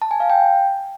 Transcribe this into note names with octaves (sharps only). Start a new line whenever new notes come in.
A5
G#5
F5
G5